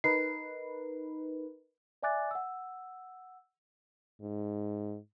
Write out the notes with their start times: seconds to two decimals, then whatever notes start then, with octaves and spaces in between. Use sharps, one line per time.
0.04 D#4 A#4 B4 C7
2.03 D5 E5 G#5 D6 F#6 A6
2.31 F#5 E6
4.21 G#2